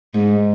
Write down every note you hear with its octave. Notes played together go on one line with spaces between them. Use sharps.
G#2